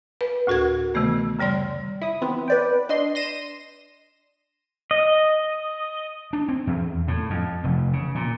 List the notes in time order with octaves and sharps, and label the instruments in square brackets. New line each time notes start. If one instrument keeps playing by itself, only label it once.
[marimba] B4
D2 A2 F#4 A#4 G#6
C3 D#3 E3 A3 B3
F#2 C#3 G3 D5 C6
[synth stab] E4 D#6
E3 B3 C4
B4 D5 G5
D4 D#5 C6
C6 A#6 D#7 E7
[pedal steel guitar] D#5
[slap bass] D4
C4
E2
A2
F2
F1
C#3
A#2